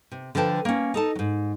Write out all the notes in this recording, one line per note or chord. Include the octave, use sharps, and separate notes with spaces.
C3
D3 F3 B4 G5 A5
A#3 C#4
D#4 A4 A5
G#2 F#3